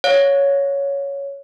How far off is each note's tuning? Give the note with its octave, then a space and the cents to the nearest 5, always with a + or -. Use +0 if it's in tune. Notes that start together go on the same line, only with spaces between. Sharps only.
C#5 +10 F5 +30